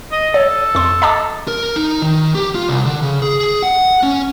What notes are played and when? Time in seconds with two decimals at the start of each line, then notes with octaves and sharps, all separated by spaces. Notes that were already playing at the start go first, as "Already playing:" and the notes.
0.12 D#5
0.34 A4 C#5
0.75 F2 C6
1.02 D#5 A5 D6
1.48 A#4
1.76 D#4
2.02 D#3
2.35 G4
2.55 F4
2.69 C2
2.85 D3
3.02 C#3
3.22 G#4
3.63 F#5
4.03 C#4